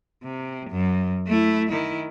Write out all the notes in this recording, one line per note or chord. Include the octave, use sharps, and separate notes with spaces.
C3
F#2
A3 E4
D#3 E4